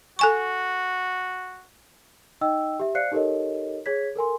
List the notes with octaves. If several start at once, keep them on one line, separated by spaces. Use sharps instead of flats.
F#4 A4 G#5 C#6
D#4 D#5 G5 E6
G4 E5
C5 D5 F5 F#6 C7 C#7
D#4 G4 A4 A#4 C#5 D#5
G#4 C#5 G#6 B6
A4 A#4 G#5 C6